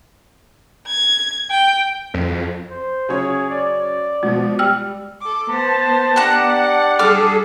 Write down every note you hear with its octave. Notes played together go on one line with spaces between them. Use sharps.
G#6
G5
F2
C5
C#3 F#3 G#4 C#5
D5
B2 F3 G#3
G3 G5 E6 F6
A4 D6
B3 C5 A5
D4 G4 D5 F#5 A5 A#5 F#6
G3 G#4 A4 D6 F6